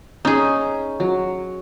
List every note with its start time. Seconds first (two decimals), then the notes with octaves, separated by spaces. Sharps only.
0.25 C#4 D#4 G#4
1.00 F#3